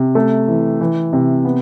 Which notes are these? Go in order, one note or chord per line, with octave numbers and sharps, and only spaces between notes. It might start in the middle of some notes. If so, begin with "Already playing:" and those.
Already playing: C3
A3
E3
E3
C3
B3